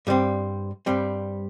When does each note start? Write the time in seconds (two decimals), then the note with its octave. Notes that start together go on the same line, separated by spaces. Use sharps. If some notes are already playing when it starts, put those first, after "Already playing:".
0.07 G2 G3 C4
0.86 G2 G3 C4